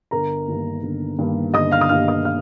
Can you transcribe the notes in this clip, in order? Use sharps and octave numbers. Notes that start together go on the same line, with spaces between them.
G1 A#4 A#5
G2 D#3 G3 A#3
G1
G2 D#3 G3 A#3
G1 D#5 D#6
F5 F6
D#6
G2 D#3 G3 A#3 F5 F6
D#5 D#6
F5 F6